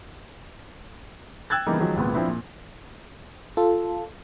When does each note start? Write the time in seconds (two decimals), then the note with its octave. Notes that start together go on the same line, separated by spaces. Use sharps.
1.50 G5 E6 F#6 G#6 A6
1.66 C#3 E3 G3 A#3 B3 D#4
1.80 D#3 F3 F#3 G#3
1.96 G#1 C#2 A#2 B3
2.14 F3 C4 D4 E4
2.28 A#2
3.57 F4 A4